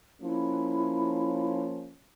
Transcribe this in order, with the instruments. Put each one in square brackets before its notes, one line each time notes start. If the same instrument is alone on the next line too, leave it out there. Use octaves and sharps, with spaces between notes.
[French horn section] F3 A#3 C#4 [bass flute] E4